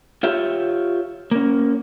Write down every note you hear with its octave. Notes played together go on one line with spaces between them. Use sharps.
F4 G4 C#5 E5
A#3 C#4